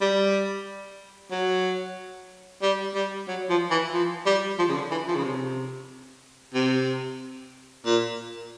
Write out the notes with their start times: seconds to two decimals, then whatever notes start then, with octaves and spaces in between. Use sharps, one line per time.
0.01 G3
1.31 F#3
2.62 G3
2.94 G3
3.28 F#3
3.50 F3
3.70 E3
3.93 F3
4.26 G3
4.59 F3
4.69 C#3
4.75 D3
4.91 E3
5.07 F3
5.16 C#3
5.23 C3
6.54 C3
7.85 A#2